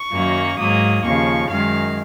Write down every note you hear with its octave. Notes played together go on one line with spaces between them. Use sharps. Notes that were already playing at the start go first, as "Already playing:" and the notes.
Already playing: C#6
F#2 D#3 F#3 A#3
G#2 F#3 A#3 D#6
D#2 C#3 F3 C#6
F#2 D#3 G#3 F5